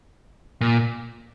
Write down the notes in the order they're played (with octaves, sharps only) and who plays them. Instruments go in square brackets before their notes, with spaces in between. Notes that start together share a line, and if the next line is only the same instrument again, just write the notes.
[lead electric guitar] A#2